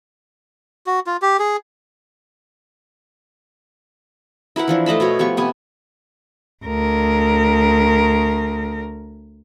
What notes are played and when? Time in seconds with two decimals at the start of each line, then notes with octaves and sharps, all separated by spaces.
0.87 F#4
1.07 F4
1.22 G4
1.39 G#4
4.56 E4 A#4 B4 F#5
4.68 E3 F3 D4
4.86 A3 D#5 A5 B5
5.00 B2 B3 C#5
5.19 F3 B3 G4 C#6
5.37 C3 B3 G#5
6.65 D2 A#4